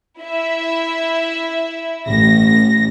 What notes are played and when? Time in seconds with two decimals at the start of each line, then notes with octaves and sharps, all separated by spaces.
0.20 E4 E5
2.08 A1 A#6